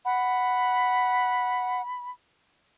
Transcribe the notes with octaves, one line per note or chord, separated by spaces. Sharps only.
F#5 B5